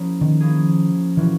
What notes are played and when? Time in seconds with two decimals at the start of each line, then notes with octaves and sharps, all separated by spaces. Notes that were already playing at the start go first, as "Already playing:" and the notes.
Already playing: F3 A#3 C#4 E4 G#4
0.21 D#3
0.40 F3 A#3 C#4 E4 G#4
1.16 A#2 E3 F3 A#3 C#4 F#4